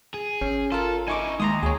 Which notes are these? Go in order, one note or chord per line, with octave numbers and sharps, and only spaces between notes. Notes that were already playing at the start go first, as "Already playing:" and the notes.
G#4
G#1 C#4
F4 A4 A#4
D#4 E4 G#5 C#6 D6
D#2 G#3 A#5 C6 D#6
D2 G#4 C#5